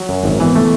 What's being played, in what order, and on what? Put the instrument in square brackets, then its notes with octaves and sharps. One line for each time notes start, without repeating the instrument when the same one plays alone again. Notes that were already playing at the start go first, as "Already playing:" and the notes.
Already playing: [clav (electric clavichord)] F#3
F#2
G#1
[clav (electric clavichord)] E3 [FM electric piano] B3
[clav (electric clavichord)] A3